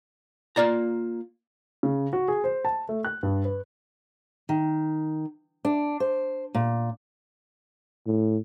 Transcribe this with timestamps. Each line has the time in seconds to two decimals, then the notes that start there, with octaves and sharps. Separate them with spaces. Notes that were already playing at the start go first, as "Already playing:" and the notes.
0.56 A#3 F4 D5 A#5
1.83 C#3
2.13 F#4
2.28 G#4
2.44 C5
2.65 A5
2.89 A3
3.05 F#6
3.23 G2
3.45 B4
4.49 D#3
5.65 D4
6.00 C5
6.55 A#2
8.07 A2